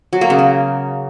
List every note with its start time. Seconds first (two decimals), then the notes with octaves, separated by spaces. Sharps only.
0.13 F#3
0.21 A#3
0.30 C#3
0.39 A#3